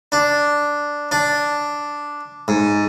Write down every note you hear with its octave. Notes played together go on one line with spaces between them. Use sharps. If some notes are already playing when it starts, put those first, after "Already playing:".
D4
D4
G#2